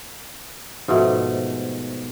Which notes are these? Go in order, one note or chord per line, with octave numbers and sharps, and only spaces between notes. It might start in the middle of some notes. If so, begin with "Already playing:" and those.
G#2 B2 F3 A3